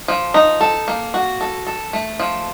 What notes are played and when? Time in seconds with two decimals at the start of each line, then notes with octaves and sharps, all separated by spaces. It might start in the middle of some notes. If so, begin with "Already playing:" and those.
0.08 F3
0.34 D#4
0.61 A4
0.88 A#3
1.14 F#4
1.41 A4
1.67 A4
1.93 A3
2.20 F3